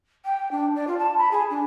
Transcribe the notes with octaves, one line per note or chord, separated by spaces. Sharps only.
G5
D4
D5
F4
A5
B5
G#4
D4